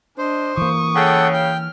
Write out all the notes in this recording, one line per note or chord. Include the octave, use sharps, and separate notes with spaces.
D4 C5 D#5
E3 A#3 C#6 D#6
C#3 A4 F#5 G5
G5 F6